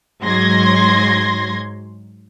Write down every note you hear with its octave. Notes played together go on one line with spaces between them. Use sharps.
G#2 F#3 C6 G#6 A#6